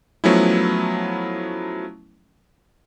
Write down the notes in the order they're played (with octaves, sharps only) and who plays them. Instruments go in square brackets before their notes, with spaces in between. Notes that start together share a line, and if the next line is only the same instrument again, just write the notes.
[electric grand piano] F3 F#3 A3 B3 C#4 E4